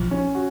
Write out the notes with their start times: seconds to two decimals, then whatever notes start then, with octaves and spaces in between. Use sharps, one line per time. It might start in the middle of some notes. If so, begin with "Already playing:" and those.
Already playing: B1 F3
0.11 C#4
0.35 F#4